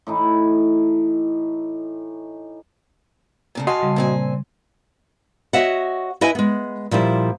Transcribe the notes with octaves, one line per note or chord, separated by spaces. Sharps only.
A2 E3 D#4
A#2 C#3 A3
F#4 D#5 F5 G#5 A5 C6
C#3 G3
A#2 C4 G#5
F#4 C#5 D#5 E5 F#5
E4 B4 D#5 E5 G#5
G#3 B3
A#2 F3 G3 E4